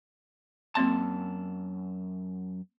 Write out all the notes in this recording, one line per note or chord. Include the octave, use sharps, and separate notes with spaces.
F#2 A#3 C4 A5 C6